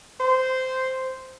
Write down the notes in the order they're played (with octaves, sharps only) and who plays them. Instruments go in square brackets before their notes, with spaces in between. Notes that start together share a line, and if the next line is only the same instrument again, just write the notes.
[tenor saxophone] C5